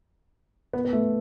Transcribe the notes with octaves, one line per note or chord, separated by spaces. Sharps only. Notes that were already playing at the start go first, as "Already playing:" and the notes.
B3
B3
A3